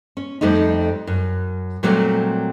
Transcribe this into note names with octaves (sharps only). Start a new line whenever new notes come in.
C#4
F2 G3 A3 D#4
F#2
A#2 F#3 G3 A3 C4 A#4